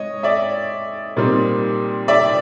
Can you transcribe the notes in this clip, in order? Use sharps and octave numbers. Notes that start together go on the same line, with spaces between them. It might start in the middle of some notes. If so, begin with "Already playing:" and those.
Already playing: G#3 C#5 D#5
D5 E5
A#2 G3 C4 D#4
D5 E5